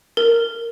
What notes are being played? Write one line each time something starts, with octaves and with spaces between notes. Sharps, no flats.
A#4